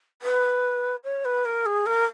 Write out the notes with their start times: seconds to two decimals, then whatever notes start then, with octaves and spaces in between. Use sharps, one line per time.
0.22 B4
1.04 C#5
1.25 B4
1.45 A#4
1.66 G#4
1.86 A#4